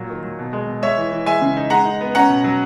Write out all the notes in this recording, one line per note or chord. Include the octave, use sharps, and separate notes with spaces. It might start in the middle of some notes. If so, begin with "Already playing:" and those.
Already playing: A#2 F#3
D#3
F#3
B2
G#3
B2
G#3 C#5 E5
E3
E3
G#3 E5 G#5
C#3
D#4
G#3 F#5 A#5
D#4
B3
C#4 F#5 A#5
B2
F#3